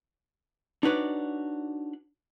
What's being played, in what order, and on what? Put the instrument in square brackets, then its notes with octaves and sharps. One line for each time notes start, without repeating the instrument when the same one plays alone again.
[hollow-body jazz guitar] D4 D#4 F#4 B4 C#5 D5